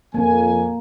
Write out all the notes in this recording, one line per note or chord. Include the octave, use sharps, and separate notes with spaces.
F2 A#3 G#5